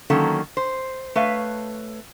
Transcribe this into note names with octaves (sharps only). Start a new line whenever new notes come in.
D3 D#3 F#3 A#3 C#4 A4
C5
A3 B4 C#5 F5